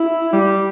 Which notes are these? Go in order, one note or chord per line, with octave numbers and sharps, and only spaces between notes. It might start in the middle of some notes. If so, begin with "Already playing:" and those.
Already playing: E4
G3